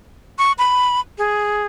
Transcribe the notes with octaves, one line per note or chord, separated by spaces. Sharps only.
C#6
B5
G#4